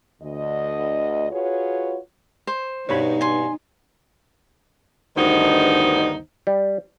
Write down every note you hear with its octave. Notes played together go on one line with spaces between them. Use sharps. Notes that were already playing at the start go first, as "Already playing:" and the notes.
D2 D3 D#5
F4 F#4 G#4 B4 C#5
C5
G2 B2 D#4 C#5 B5
G#5 C6
D2 G2 D#3 B3 D#4 C5
G3